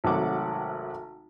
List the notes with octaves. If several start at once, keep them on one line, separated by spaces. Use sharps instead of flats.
G#1 C3 F#3 A3 F#5 D6